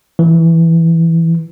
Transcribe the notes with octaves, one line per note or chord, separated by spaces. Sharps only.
E3